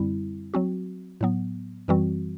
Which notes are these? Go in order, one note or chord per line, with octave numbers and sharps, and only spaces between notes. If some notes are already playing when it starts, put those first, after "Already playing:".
Already playing: F#2 D3 G3 C4 E4
F#3 C4 F#4
A2 F#3 B3
F#2 E3 G3 C4 F#4